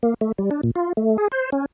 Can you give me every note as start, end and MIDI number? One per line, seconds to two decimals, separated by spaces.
0.03 0.14 58
0.21 0.32 57
0.38 0.50 55
0.51 0.61 62
0.63 0.71 46
0.75 0.93 65
0.97 1.17 57
1.18 1.28 68
1.32 1.50 72
1.52 1.66 61